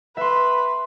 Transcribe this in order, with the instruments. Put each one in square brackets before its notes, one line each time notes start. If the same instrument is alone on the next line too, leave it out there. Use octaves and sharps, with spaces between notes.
[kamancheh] B4 [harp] E5 C6